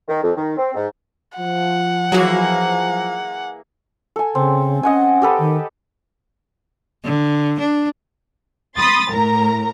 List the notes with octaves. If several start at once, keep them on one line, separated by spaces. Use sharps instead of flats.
D#3
F2
D#3
C4
G#2
F3 F#5
E3 F#3 A#3 F#4 G#4
A4 G#5
C#3 C4
C#4 D#5 F#5 G#5
G4 A4 B4
D#3
D3
D4
B5 C6 D#6 A6
A2 A#4 A#5